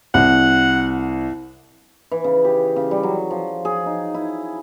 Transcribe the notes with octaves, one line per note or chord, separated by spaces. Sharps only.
C2 F#5
E3
C#3
G4
C#3
G3
F#3
F3
G#4
D#4
E4